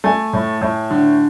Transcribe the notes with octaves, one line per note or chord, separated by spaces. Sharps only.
A3 G#5
A2
A2
D3